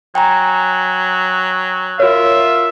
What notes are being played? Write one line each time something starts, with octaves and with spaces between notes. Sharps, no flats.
F#3 G5 G#5 A#5
F4 F#4 A#4 C#5 E5